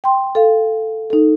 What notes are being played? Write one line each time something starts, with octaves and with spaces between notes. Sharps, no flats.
G5 C6
A4 F5
D#4 A4